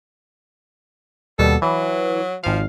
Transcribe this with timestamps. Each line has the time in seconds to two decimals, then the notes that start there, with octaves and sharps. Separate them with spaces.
1.39 D#2 B2 G3 A4
1.62 E3 F#3
2.44 G#1 F3 F5